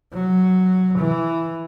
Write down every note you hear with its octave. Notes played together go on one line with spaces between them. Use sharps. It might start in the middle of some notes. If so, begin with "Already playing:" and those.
F#3
E3